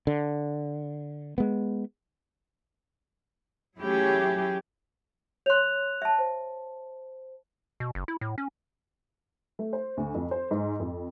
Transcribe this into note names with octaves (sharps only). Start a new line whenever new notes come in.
D3
G#3 B3
F#3 A3 C#4 E4 G4 G#4
C#5 C6 F#6 F7
E5 A5
C5
B2
F#1
E4
A2
C#4
A3
C5
D2
F2
C5
G#2
F2